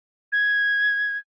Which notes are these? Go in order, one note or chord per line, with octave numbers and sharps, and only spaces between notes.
G#6